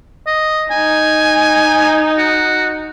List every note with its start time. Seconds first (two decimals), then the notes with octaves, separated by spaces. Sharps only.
0.27 D#5
0.71 D#4 G#5
2.17 F#4